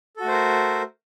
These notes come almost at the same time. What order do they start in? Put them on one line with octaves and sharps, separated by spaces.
A4 F#4 A3 C5 A#4